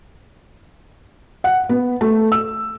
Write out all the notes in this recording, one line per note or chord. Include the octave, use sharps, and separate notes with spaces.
F#5
B3
A3
E6